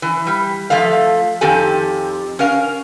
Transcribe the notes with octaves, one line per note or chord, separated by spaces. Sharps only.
E3
G3
F3 A3 E5 F5
F2 D#3 C4 G4 A4 G#5
C#4 A#4 F5